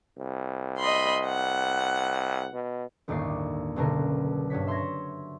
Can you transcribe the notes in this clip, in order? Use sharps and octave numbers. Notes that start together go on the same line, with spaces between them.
C2
D#5 B5 C6
F#5
B2
G1 D#2 A2 D5 C#6 C7
F#1 B1 B2 D3 A#4
G2 F#4 C#5 B6
E5 C6 C#6 G#6 A#6